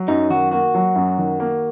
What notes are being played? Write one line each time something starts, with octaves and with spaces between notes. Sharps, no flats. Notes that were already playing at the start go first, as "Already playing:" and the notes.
Already playing: F#3
F#2 D#4
D#3 F#4
A#3 F#4
F#3
F#2
D#3
A#3